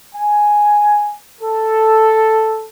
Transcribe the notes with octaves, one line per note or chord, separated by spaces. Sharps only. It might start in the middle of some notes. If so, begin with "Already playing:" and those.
G#5
A4